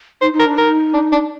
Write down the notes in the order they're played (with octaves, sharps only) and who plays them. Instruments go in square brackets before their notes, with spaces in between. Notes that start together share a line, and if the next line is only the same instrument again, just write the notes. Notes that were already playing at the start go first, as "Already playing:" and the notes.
[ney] D#4 [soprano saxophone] C5
[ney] D#4
[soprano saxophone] A#4
[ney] D4
[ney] D#4 [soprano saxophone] A#4
[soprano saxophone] D4
D4